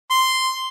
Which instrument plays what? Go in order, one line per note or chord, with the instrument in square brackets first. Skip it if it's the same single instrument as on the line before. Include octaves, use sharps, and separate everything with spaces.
[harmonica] C6